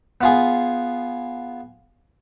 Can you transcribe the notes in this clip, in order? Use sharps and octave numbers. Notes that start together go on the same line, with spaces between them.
B3 F4 G#4